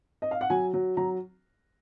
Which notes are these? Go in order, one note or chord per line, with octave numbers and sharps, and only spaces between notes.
D#5
F5
F#5
F#3 G#5
F#3
F#3 A#5